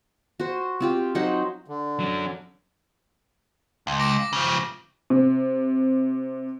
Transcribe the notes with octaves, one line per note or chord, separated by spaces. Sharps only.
F#4 C5
C4 F4 G4
F#3 D#4 C5 F#5
D3
F#3 C#4
C#2
D6 A#6 D7
C#3 F3
C3